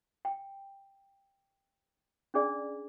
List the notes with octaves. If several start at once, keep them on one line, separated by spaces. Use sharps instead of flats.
G5
C#4 D4 G#4 D5